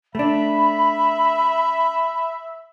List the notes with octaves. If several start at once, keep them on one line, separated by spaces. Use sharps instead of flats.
A3 D4 E5 B5